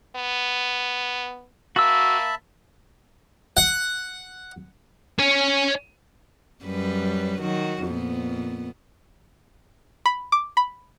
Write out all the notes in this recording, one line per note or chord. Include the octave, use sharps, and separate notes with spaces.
B3
A#3 F#4 E5 A5 B5 E6
F#5
C#5 G#5
F#2 G3 B4
D#3 F#3 F#4
F2 A#2 B3
B5
D6
B5